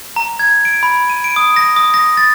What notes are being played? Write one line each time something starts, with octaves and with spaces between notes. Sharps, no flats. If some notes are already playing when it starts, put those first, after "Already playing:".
A#5
G#6
D7
B5
D#7
D7
D#6
A#6
D#6
A#6
A6